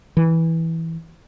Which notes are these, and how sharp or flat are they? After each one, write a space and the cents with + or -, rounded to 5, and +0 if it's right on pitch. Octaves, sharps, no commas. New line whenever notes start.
E3 -10